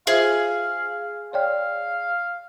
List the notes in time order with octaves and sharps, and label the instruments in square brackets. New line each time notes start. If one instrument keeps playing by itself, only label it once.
[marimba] F4 C5 E5 [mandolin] G#4 [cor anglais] F5
[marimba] C#5 D5 G5 [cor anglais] F5